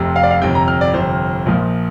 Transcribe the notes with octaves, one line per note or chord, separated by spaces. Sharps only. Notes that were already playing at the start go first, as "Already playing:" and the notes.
Already playing: F1 F2 C3
F5
D5
F5
G1 F2 C3 G5
A#5
F6
D5
G1 F2 C3 C5
A#1 A#2 F3